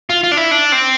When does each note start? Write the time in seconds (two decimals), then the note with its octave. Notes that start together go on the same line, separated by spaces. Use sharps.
0.10 F4
0.24 F4
0.32 D4
0.37 E4
0.51 D4
0.72 C4